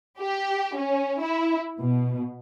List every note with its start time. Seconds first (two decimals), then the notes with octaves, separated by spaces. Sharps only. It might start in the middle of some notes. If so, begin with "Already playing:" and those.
0.19 G4
0.76 C#4
1.20 E4
1.79 B2